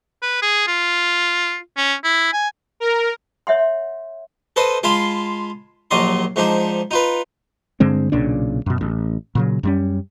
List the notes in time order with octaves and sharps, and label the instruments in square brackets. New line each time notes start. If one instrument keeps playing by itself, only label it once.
[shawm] B4
G#4
F4
C#4
E4
G#5
[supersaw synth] A#4
[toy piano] C#5 E5 F#5 C6
[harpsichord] A4 B4 C5 D#5
G#3 F4 F5 A5 B5 C6
A#1 D#2 F#3 D5 D#5 C6
G#2 F3 D4 D#4
D#4 F4 B4
[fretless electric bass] G2 D3 G#3 C4
B1 A#2 C#3 D4
F#2 B2
A1
A#2 C#3 F#3
F#2 G3 C#4